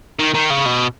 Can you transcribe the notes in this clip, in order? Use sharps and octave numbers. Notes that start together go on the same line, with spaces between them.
D#3
D#3
C#3
B2